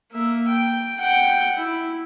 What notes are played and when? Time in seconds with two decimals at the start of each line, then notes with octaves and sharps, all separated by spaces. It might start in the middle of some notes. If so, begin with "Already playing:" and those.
0.12 A#3 E5
0.48 G5
0.99 F#5 G5
1.57 E4